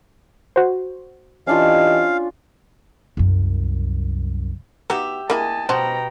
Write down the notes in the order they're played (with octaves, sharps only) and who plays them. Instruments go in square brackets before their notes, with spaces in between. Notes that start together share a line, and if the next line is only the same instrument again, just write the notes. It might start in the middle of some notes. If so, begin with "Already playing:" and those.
[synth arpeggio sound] F#4 C5
[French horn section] E3 G4 D#5 [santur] C#4 D4 F4 [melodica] F5
[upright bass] C2 F#2
[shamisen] B3 D#4 F#4 [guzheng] G4 E5
[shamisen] A#3 E4 G#4 [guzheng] D#5 [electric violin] G#5 A5
[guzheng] B2 [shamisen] B3 C5 A5 [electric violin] G5 A#5